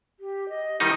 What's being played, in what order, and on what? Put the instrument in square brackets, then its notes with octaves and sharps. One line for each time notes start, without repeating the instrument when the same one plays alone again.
[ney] G4
D#5
[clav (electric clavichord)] D#3 G3 D#4 [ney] E4